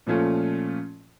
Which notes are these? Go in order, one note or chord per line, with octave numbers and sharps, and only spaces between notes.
A#2 F3 A3 C#4 F4